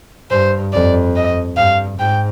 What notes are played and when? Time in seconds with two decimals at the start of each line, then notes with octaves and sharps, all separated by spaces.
0.31 G2 C5
0.73 F2 D5
1.16 D#5
1.57 G2 F5
1.98 G#2 G5